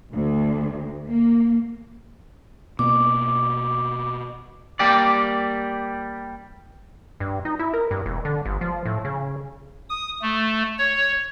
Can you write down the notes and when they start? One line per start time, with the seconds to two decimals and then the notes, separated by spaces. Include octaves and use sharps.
0.13 D2
1.08 A#3
2.79 B2 A#3 D6
4.79 G3 A#3 G4 D5
7.20 G2
7.45 D#4
7.59 E4
7.74 A#4
7.91 G2
8.06 E1
8.25 D3
8.45 G1
8.61 F3
8.85 A2
9.05 C#3
9.90 D#6
10.22 A3
10.78 C#5